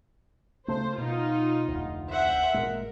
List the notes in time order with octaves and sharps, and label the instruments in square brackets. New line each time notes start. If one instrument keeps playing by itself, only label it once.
[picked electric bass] C#3 A3 [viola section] C5
[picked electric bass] B2 [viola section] D#4 F4
[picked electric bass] F1 D2
[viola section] C5 E5 F#5
[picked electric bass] G#1 A#2 G#3 [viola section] A#4